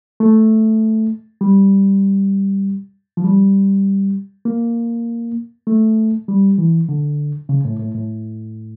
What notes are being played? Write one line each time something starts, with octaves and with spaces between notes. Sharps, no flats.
A3
G3
F3
G3
A#3
A3
G3
E3
D3
C#3
A2
A2
A2